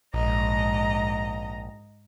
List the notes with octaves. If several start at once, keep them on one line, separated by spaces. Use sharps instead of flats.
A#1 G#2 D#5 A#5